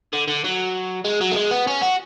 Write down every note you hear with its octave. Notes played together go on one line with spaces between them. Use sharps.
D3
D3
F#3
G#3
F#3
A3
G#3
B3
C#4
F#4